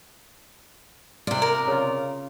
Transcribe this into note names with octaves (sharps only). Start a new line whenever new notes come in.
C3 F4 D5
A#4
C#3 F4